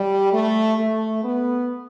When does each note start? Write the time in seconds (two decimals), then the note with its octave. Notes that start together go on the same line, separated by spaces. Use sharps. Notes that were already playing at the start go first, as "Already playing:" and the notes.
Already playing: G3
0.32 A3
0.78 A3
1.24 B3